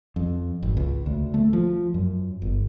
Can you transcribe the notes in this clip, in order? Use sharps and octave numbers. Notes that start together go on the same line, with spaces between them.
F2
G#1
C#2
D2
A3
F3
F#2
G1